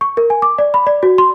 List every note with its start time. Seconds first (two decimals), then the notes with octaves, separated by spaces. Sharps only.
0.01 C#6
0.17 A#4
0.30 G#5
0.42 D6
0.58 D5
0.74 B5
0.87 D5
1.03 F#4
1.18 C6